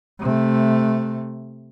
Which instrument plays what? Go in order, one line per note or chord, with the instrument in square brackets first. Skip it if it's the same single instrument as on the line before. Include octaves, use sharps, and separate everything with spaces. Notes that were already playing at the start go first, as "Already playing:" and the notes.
[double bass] C3 A3